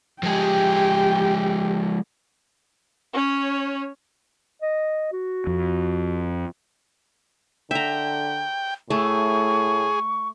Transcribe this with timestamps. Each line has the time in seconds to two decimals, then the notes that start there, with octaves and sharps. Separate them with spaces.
0.23 F3 G#3 G4 G#4 G5
3.13 C#4 C#5
4.62 D#5
5.13 F#4
5.47 F2
7.71 D3 E5 G5 A#5
8.90 A2 A3 G#4 C#6